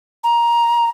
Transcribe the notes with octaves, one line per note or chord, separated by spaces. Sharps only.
A#5